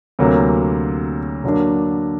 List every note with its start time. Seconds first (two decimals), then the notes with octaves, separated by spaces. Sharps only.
0.19 D2 C3 F#3 A#3
1.44 D3 F#3 A#3 D4